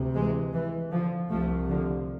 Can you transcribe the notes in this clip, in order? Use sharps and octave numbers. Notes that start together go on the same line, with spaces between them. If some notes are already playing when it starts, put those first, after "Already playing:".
Already playing: D2 C3
E3 G#3
E3
D3 F3
C2 C3 F3 A3
D3 F3